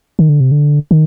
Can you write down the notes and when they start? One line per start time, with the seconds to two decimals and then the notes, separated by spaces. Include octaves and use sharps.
0.19 D#3
0.29 D3
0.40 C3
0.51 D3
0.91 D#3